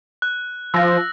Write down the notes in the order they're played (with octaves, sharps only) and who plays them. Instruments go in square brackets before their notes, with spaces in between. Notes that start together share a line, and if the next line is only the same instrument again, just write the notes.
[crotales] F#6
[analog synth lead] F3 [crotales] E6 A#6